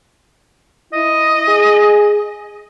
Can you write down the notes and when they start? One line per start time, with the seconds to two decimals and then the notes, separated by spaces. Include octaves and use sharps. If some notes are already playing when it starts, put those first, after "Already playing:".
0.93 E4 D#5
1.48 G#4